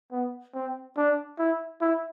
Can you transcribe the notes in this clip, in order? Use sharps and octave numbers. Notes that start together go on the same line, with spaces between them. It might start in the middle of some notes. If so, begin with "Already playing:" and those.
B3
C4
D4
E4
E4